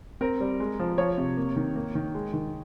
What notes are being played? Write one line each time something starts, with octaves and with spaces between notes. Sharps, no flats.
C4 A#4
G3
G#3
F3
F3 C#5
C3
A#3
D#3
A#3
D#3
G#3
D#3